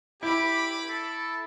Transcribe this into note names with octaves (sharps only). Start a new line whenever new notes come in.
E4 G4 B5 D6
A4